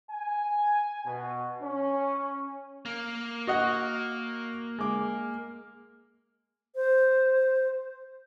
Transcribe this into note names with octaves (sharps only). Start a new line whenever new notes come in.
G#5
B2
C#4
A#3
F#4 D#5 F#5
G#3 D6
C5